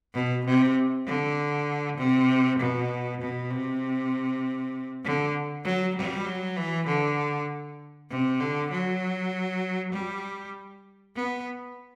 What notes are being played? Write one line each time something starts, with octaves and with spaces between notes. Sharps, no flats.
B2
C3
D3
C3
B2
B2
C3
D3
F#3
G3
F#3
E3
D3
C3
D3
F#3
G3
B3